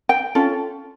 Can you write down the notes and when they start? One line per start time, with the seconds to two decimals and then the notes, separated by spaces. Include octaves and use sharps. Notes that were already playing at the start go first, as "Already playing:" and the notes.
0.09 G5
0.35 C#4 F4 A4